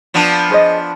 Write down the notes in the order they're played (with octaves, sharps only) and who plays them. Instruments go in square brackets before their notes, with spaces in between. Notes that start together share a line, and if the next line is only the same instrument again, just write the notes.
[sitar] F3 B3 D4
[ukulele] G#4 C5 D#5